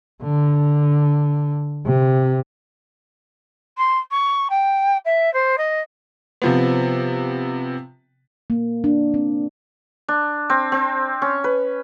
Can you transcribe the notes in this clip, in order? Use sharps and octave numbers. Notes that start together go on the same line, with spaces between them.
D3
C3
C6
C#6
G5
E5
C5
D#5
C3 F3 B3
A#3
D4
C4
D4
C4
C4
C#4
B4